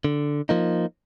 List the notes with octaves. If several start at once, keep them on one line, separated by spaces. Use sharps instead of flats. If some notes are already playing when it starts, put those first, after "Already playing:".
D3
F3 A#3 D#4